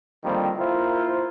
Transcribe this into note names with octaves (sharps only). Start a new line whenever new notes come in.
D3 D#3 F3 G3 A#3 C4
A#3 E4 F4 A#4 C5